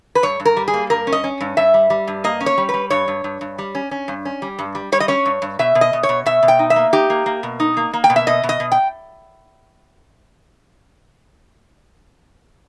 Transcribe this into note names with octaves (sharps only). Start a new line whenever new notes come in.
B4
G2 C#5
G2
A#4
G3
G#4
A#3
G2 A#4
C#4
D#5
C#4
G2
G2 E5
G3
G3
G2
A#3 D#5
C#4
C#5
G3
B4
G3
G2 C#5
G2
G2
G2
G3
C#4
C#4
G2
C#4
G3
G2
G3
G3 C#5
D#5
C#4 C#5
G2
G2
B2 E5
B2
D#5
B2
C#5
B2
B2 E5
B2
G5
D#4
E5
A#3
D#4 G4
A#3
A#3
B2
D#4
A#3
A#3
G5
B2
E5
B2 D#5
B2
D#5
B2
G5